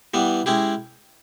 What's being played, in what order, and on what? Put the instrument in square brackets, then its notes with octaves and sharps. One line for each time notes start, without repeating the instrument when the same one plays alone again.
[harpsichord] E3 G3 B3
G#3 C#4 E4 G4